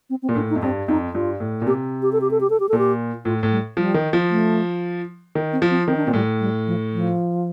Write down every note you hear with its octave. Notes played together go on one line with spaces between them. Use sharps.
C4
C4
A#2
A2 D4
D#4
F2
G2 C4
F2 D#4
G2 F4
A2
A#2
C3 G4
G4
A4
G4
A4
G4
A4
G4
A#2 A4
G4
A2 F4
A2
G3
F3 G3
D#3
F3
A3
D#3
C4
F3
C4
D#3 C4
D4
A#2 C4
A2 G3
G3
F3
F3